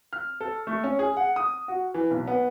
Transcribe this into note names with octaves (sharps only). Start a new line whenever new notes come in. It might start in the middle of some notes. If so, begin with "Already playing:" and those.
F6
A4
A3
C#4
G#4
F#5
D#6
F#4
E3
B1
B3